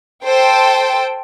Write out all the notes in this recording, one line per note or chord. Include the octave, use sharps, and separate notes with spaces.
A4 C5 G5